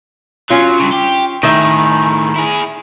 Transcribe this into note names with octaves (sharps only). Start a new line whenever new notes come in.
F#3 C#4 F4
G2 C#3
G4
A2 D#3 G#4 E5
E4 G#4